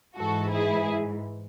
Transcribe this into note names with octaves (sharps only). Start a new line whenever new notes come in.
G#2 E3 F#4 A4
E4 G#4